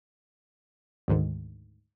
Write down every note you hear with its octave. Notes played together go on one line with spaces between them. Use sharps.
D2 G#2 D#3